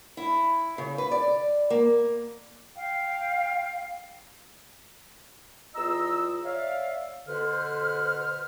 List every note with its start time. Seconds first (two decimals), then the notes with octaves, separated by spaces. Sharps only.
0.17 E4
0.78 C#3
0.98 B4
1.11 D5
1.70 A#3
2.74 F5 G5
5.74 E2 F4 D#5 A#5 E6
6.44 C#5 D5 E5 F5
7.27 B2 D3 A4 B4 C5 F6